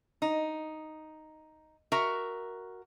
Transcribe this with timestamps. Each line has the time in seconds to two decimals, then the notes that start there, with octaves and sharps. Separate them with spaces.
0.22 D#4
1.92 F#4 A#4 E5